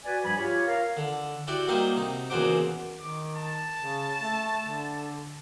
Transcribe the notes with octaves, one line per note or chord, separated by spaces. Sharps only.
F#4 B4 D5 G#5
G2 F3 G3 G#5 B5
F4 G4 C#5
A#4 F5
D3
E4 F#4 G4 D5
F#3 G3 A#3 D#4 C5 D#5
C3 D#4
E2 A#2 C#3 F#4 C5 D6
D#3 D6
A5
C#3
A3
D3